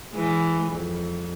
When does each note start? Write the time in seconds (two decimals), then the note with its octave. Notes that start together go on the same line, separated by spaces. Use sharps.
0.12 E3 G#3
0.72 F2